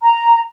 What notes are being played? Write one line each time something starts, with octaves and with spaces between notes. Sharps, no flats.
A#5